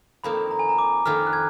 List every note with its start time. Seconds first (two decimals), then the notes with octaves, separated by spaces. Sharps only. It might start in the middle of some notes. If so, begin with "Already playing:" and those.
0.24 F2 D#3 A#3 B5
0.51 A#5
0.59 G#5
0.69 A#5
0.79 D6
1.05 F2 D#3 A#3 F6
1.27 F#6
1.33 G#6